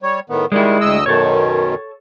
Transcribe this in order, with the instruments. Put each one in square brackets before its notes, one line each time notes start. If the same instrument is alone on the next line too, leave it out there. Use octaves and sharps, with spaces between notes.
[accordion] G3 C#5
A2 D#3 B3
[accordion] D#3 G3 [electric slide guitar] G#3 E4
[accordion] D2 D#5 E6
[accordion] F#2 B2 D#3 [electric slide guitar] A4 C#5